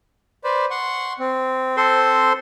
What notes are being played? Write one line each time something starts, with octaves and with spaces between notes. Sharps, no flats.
B4 C5 D5
F#5 C6 C#6
C4
A4 C5 C6